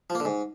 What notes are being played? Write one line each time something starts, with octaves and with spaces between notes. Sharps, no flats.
F3
A#3
D3
G#2